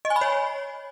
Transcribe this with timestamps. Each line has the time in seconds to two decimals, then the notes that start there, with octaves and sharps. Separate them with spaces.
0.05 D#5
0.10 G#5
0.16 B5
0.21 C#5